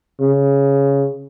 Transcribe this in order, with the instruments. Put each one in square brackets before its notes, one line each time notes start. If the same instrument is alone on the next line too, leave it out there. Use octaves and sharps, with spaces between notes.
[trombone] C#3